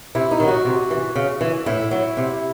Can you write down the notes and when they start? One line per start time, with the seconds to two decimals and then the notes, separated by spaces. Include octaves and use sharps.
0.15 C3 E4
0.31 D#4
0.40 D#3 F#3
0.48 F#4
0.65 C3
0.90 E3
1.16 C#3
1.41 E3
1.66 A2 E4
1.91 F#3
2.17 C3